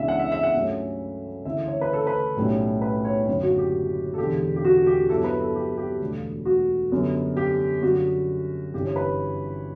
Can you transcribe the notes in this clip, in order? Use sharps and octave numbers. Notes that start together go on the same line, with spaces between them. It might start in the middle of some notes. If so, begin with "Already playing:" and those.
Already playing: C#2 C#3 E3 B3 D4 E5
F#5
E5
E5
F#5
G2 F#3 A3 C#4
D2 C#3 E3 A3 E4 E5
C#5
B4
A4
B4
B1 A2 G3 C#4
B4
C#5
F#1 F#2 D3 C#5
F#4
G4
A4
E1 E2 D3 G4
G4
F#4
G4
G2 F#3 B3 E4 A4
B4
A4
G4
G4
E1 D2 D3 G3
F#4
F#2 D3 G3 B3
G4
F#2 D3 G3 F#4
G1 G2 E3 G3 C#4 G4
C#5
B4